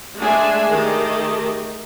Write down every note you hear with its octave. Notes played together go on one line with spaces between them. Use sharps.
G#3 A3 D4 G#4 E5 G#5
D#3 A3 G4 G#4 D#5